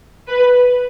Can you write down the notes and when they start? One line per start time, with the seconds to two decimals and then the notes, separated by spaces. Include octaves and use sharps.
0.29 B4